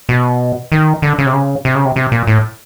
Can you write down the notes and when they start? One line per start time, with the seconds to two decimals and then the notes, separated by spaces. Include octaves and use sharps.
0.09 B2
0.72 D#3
1.02 D3
1.18 C#3
1.26 C3
1.33 C#3
1.65 C3
1.75 C#3
1.85 C3
1.96 C3
2.12 A#2
2.27 A2